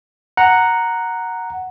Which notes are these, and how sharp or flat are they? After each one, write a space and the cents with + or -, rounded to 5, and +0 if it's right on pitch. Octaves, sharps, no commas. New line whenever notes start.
F#5 +0 A#5 +0